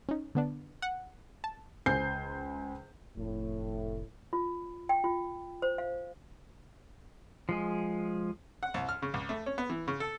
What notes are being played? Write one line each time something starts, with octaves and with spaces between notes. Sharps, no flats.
C#4 D#4
D3 B3 D4
F#5
A5
C#2 C5 G#5 G6 C7
F1 A2
F4
G5
F4
C5
F5
F3 G#3 G#4
F#5
C2
F6
C#3
C#2
A3
C#4
B3
E3
C#3
A4